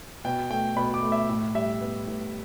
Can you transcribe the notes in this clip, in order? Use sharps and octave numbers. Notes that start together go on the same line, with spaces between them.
B2 G5
A3 G5
B2 B5
D6
A3
E5
A2
G3 E5
B3
A2